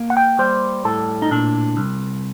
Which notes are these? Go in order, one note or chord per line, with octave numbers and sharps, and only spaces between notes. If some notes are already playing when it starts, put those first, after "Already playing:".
Already playing: A#3
F#5
G5
G3 C5
A2 A4
D#4
A#2 D4
C2